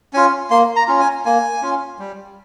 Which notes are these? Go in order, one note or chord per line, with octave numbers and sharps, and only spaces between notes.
C#4 F4 G#5
A#3 C6
A#5
C#4 F4
G#5
A#3 G#5
C#4 F4
G3